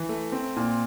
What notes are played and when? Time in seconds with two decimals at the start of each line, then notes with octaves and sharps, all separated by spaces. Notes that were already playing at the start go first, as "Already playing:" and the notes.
Already playing: E3
0.09 A3
0.32 C4
0.56 A#2